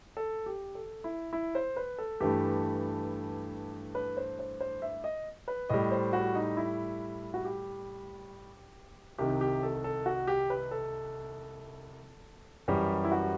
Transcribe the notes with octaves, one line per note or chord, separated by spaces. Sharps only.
A4
G4
A4
E4
E4
C5
B4
A4
G2 E3 A3 G4
B4
C5
C5
C5
E5
D#5
B4
A2 G3 D#5
C5
F#4
D#4
E4
F#4
G4
C2 C3 D#3 G4
G4
A4
A4
F#4
G4
B4
A4
F#2 E3 G3 G4
E4
F#4